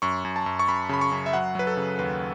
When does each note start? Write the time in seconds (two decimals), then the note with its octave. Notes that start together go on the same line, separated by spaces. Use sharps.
0.02 F#2 C#6
0.25 F#2
0.36 A5
0.46 F#2
0.59 C#6
0.68 F#2 B5
0.89 C#3 B5
1.01 C#6
1.11 F#2
1.26 E5
1.33 F#3 F#5
1.55 F#3 B4
1.67 A4
1.77 C#3
1.99 D#2 B4